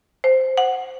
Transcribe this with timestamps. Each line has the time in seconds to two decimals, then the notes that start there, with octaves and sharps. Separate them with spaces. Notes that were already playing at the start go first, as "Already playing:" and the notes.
0.24 C5
0.57 F#5